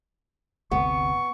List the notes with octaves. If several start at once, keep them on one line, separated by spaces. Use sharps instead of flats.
G1 D2 C3 B3 C#6